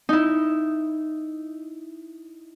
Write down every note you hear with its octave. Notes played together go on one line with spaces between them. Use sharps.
D#4 E4